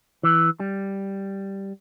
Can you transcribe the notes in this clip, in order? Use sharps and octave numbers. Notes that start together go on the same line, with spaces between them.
E3
G3